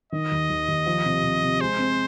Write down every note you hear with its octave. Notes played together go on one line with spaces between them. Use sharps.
D#3 D#5
D#2
D#2
D#2
F3
C3
C3
C3
G#3 C5
C4